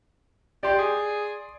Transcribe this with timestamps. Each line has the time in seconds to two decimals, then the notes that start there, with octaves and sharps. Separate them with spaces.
0.63 G4 D5 C6
0.78 G#4